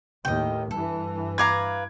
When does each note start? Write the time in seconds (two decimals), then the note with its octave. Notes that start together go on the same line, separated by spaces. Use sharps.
0.25 D#2 A2 D#5 G5
0.71 G2 E3 A4
1.38 B4 F5 A#5 D6 G#6